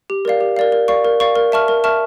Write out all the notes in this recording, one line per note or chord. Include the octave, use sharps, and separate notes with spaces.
G4
A#4 D5 F5
G4
A#4 D5 F5
A#4
D5 F5 C#6
A#4
D5 F5 C#6
A#4
E5 A5 C#6 F6
A#4
E5 A5 C#6 F6